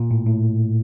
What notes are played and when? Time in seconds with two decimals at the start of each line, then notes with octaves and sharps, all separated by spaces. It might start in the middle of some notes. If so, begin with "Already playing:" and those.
Already playing: A#2
0.11 A2
0.26 A2